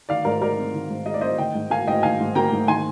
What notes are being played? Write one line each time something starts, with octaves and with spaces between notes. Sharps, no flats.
D#3 D5 F5
G#2 A#4 D5
G#3 A#4 D5
C4
D#3
G#2
G#3 D#5
D5
C4 C5 D#5
D#3 D#5 G5
G#2
A#3 F5 G#5
G#2 D#5 G5
D#3 F5 G#5
G#2
A#3 G5 A#5
G#2
D#3 G#5 C6